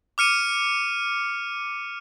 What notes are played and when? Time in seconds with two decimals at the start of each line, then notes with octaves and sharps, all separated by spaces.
0.18 D6 F6 C#7 D#7